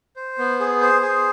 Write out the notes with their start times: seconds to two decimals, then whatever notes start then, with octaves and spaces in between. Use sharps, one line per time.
0.16 C5
0.38 B3
0.60 G#4
0.81 C5
1.02 G#4